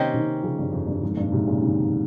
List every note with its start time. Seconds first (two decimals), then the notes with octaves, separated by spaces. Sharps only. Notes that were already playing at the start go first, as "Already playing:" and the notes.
Already playing: C3 D#3 A#3 C#4 G4 C5 D#5
0.14 C3 D#3
0.43 C#3 F3
0.59 G2
0.73 F2
0.87 G2
1.03 F2 G#2
1.17 G2 A#2
1.32 G#2 C3
1.47 A#2 C#3
1.62 C3 D#3